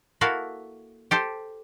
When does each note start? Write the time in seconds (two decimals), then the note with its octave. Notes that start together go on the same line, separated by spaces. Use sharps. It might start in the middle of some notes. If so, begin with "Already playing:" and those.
0.21 A#3 E4 F#4 A4 F5
1.11 G4 A4 C5